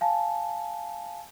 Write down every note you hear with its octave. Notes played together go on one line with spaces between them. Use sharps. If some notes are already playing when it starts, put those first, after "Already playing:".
F5 G#5 A5